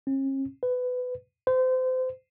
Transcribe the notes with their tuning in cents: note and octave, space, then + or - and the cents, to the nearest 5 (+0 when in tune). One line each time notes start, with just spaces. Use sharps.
C#4 -45
B4 +20
C5 -30